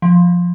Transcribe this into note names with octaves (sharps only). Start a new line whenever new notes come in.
F3